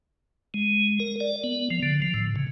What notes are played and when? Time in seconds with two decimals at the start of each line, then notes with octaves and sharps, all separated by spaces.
0.54 G#3
1.00 A#4
1.20 D5
1.44 B3
1.71 F3
1.83 D3
2.02 F3
2.14 A2
2.36 C#3